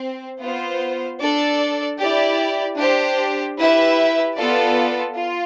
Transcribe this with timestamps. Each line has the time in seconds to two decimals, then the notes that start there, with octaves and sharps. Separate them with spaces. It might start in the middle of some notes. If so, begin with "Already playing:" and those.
Already playing: C4
0.41 B3 F4 C5
1.20 D4 A4 D5
1.99 E4 G4 D5
2.77 D4 G4 C5
3.57 E4 G4 B4 E5
4.36 B3 F4 A4 D5
5.15 F4